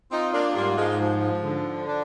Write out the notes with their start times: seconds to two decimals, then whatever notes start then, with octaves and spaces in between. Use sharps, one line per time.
0.11 C4 D#4 F4
0.34 A#3 D4
0.55 G#2 G3 A#3
0.77 F3 G#3
0.99 F3
1.43 D3
1.87 D4